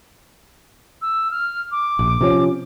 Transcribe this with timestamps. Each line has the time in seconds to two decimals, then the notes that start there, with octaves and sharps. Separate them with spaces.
1.02 E6
1.31 F6
1.71 D6
1.99 A#1
2.21 C3 F3 C#4